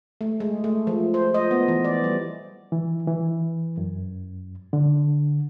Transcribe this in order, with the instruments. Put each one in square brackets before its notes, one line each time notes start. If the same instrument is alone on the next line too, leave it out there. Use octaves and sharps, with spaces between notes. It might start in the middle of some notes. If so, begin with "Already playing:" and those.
[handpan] A3
G#3
A3
F3
C5
D#5
B3
E3
D5
G3
[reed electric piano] E3
E3
F#2
D3